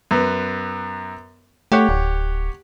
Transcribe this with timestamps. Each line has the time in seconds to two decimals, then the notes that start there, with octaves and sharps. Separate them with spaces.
0.11 F#2 B3
1.72 A3 G4 C#5 F#5
1.89 D1